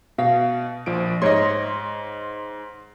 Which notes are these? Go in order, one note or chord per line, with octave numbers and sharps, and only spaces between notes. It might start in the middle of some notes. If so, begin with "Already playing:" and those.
B2 F5
A#1 F3 D7
G#2 C#5 D#5 C6